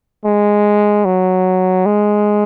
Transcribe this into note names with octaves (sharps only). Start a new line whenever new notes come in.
G#3
F#3
G#3